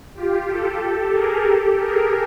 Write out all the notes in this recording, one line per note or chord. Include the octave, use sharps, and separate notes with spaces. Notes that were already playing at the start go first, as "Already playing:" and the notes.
F4 G4
G4 A4
G4 A4
G#4 A#4
G4 A4
G#4 A#4